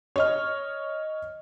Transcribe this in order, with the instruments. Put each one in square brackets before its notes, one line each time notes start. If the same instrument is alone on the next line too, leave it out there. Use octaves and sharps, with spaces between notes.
[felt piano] C#5 D#5 F6